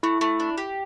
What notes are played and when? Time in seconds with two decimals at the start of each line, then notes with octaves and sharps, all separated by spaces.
0.03 A3 E4
0.21 A3
0.40 D4
0.58 G4